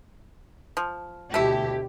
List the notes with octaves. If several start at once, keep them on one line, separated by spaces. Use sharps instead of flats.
F3
D2 B2 A3 E4 G4